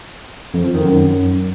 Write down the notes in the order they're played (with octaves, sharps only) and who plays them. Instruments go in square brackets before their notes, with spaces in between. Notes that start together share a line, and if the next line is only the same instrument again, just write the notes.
[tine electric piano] F2
F3
D#3
F#2